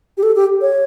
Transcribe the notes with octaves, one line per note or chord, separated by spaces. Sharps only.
G4
A4
G4
C#5